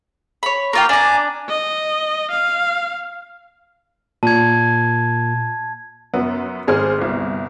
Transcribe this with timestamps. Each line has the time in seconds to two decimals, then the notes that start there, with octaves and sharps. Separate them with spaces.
0.43 C#5 B5
0.73 A#3 F4 G5 A#5 C#6
0.89 D4 G#5 A#5 D6
1.49 D#5
2.31 F5
4.23 A#2 A5 G#6
6.14 F#2 B3
6.67 G#1 G#4 C5 F6
6.99 G1 C2